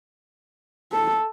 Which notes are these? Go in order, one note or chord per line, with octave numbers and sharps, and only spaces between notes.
A4